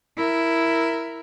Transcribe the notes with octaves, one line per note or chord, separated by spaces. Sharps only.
E4 A#4